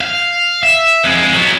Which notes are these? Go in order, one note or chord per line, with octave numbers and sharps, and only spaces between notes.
F5
E5
F2 G#3
F#3 B3